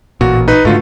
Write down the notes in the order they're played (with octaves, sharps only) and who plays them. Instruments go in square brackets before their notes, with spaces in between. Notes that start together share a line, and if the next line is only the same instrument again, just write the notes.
[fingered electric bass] A1 A#2 [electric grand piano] F#4
[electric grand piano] D#4 B4
[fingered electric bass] G#2 D3 [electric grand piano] A3 F4 F#4